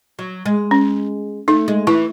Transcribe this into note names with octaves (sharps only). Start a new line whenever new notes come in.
F#3
G#3
C#4
A3 D#4
G#3
E3 E4